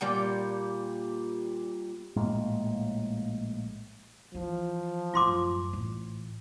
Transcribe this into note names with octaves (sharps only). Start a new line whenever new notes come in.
A#2 G3 G5
A#1 A2 G#3 A#3
E3 F3
A1 F#2 F4 C6 D6
A1